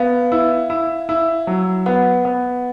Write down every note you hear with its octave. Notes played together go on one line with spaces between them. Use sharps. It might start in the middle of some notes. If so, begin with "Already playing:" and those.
Already playing: B3 F5
E4
E4
E4
F#3
B3 F#5
B3